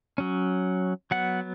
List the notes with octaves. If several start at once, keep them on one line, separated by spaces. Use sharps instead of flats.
F#3 C#4
F#3 B3 F#5